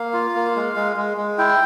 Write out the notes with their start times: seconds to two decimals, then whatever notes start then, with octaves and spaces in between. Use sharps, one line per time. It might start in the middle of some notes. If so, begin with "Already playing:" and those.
Already playing: A#3 F5
0.13 F4
0.35 A#3
0.56 G#3
0.76 G#3
0.96 G#3
1.17 G#3
1.38 E4 G5